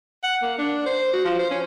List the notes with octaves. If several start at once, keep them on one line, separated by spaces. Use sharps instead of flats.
F#5
A#3
D4
C5
F#4
F3
C5
C#4